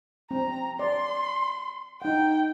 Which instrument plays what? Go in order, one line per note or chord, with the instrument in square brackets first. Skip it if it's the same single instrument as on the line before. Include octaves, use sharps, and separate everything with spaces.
[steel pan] C4 [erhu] A#5
[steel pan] D5 [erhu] C6
[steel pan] D#4 F#5 [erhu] G5